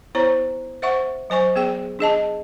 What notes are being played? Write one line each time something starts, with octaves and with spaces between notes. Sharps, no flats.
B3 E4 C5 C#5 A#5
C5 E5 F#5 C#6
F#3 C5 G#5 C#6
B3 G#4 G5
D4 G#4 D#5 A5